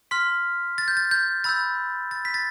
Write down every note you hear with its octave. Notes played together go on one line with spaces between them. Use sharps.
C6 F6 B6
A6
G6
A6
G6
B5 E6 G6 A6
A6
B6
A6